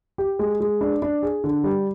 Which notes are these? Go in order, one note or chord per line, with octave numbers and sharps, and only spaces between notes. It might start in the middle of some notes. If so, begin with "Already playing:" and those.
G4
G#3
G#3
D4
D4
G#4
D3
G3